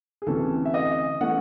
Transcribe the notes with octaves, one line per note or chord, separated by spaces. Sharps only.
G#4
D2 C3 E3 A3 C#4 A4
E5
D#5
E3 A3 C#4 F#5